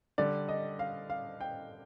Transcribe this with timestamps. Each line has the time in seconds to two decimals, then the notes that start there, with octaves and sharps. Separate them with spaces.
0.18 D3 G3 D5
0.49 D#5
0.79 F5
1.10 F5
1.41 G5